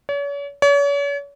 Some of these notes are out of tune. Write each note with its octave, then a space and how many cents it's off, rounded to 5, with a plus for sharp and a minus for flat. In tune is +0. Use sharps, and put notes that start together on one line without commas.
C#5 +40
C#5 +40